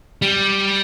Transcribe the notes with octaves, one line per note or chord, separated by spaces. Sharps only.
G3